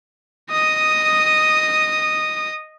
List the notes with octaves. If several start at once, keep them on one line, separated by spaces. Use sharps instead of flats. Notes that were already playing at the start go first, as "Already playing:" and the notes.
D#5 D#6